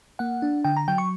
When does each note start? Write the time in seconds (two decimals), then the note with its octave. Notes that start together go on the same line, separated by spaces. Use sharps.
0.19 A#3 F#5
0.42 D4
0.64 D3 G5
0.77 A#5
0.88 F#3 G5
0.98 C#6